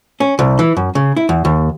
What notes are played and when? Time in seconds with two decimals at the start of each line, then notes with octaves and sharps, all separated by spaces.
0.20 C#4
0.39 C2
0.59 E3
0.77 F#2
0.95 C#3
1.17 E4
1.29 E2
1.45 D#2